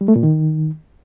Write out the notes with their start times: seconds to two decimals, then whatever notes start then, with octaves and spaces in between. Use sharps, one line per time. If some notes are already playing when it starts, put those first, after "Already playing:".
0.01 G3
0.08 A3
0.16 A#2
0.23 D#3